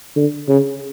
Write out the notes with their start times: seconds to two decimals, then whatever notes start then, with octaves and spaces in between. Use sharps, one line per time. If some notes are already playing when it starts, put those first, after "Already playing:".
0.16 D3
0.48 C#3